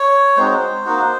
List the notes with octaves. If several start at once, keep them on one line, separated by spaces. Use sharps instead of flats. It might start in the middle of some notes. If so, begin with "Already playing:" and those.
Already playing: C#5
G#3 C4 D#4 F#4 C5
A#3 D#4 F#4